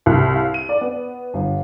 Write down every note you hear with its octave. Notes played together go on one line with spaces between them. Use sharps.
C2
F5
D#7
D5
B3
G1